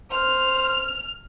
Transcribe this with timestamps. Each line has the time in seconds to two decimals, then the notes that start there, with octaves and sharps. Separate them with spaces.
0.12 C5 F6